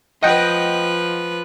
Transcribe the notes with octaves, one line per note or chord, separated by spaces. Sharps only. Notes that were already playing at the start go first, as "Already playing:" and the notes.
F3 B4 D#5 F#5 G5